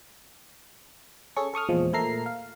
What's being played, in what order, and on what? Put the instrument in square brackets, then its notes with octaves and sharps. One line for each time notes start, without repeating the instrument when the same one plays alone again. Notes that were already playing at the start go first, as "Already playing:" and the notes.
[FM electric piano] C#4 G#4 A4 C#6
A4 C#6 D#6 F6
E2 A#2 F3 G#3
A#2 A3 A4 A#4 A#5 C7
F5